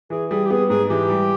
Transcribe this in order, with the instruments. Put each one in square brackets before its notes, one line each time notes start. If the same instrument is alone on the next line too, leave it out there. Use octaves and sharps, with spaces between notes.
[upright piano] E3 [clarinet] G#4
[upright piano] G3 [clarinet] G#4
[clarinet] G4
[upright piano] B3 [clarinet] G#4
[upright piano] G#2 [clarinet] G#4
[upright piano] E3 [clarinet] G4
[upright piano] G3